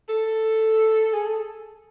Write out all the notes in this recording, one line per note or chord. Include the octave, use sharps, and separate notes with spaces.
A4
G#4
A4